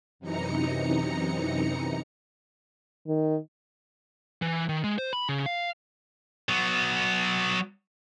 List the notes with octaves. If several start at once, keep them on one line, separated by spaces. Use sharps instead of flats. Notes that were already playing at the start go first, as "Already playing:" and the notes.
F#2 C3 E3 D#4 A#5 C#7
D#3
E3
D#3
G#3
C5
B5
C#3
F5
F#3 B3